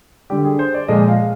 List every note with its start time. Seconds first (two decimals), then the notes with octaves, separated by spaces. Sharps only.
0.30 D3 G3 G4
0.45 G#4
0.59 C5
0.74 D5
0.88 A#2 F3 G#3 D#5
1.08 F5